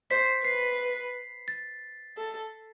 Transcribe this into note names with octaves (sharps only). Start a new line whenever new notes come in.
C5 B6
B4 C7
A6
A4